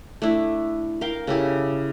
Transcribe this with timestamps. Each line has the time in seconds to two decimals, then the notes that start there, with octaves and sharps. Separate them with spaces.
0.22 A3 D4 E4
1.01 A#4 F5 G5
1.27 C#3 E4 G4 A4